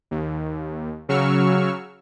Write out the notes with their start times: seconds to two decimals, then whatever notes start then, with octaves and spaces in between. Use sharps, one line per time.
0.11 D#2
1.09 C#3 F#3 C#6 E6 F6